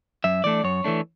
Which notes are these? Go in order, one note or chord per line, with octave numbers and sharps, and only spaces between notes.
F#2 E5
E3 A3 D4 D5
F#2 C#5
E3 A3 D4